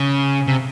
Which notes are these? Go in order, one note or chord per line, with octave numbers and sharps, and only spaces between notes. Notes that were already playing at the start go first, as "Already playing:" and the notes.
Already playing: C#3
C3